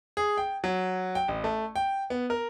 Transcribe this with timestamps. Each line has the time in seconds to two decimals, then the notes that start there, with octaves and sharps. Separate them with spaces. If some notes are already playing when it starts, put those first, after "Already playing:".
0.17 G#4
0.38 G5
0.64 F#3
1.15 G5
1.28 A1
1.44 A3
1.76 G5
2.10 B3
2.30 A#4